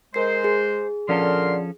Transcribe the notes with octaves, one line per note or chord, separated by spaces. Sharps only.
G#3 A#4 C5 C7
G#4
A#2 D3 F3 C#4 A4 A#4 C6